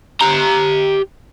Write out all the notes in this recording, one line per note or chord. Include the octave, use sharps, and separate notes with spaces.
G4 A#5